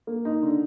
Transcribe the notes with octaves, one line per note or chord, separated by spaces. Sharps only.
A#3
D#4
D3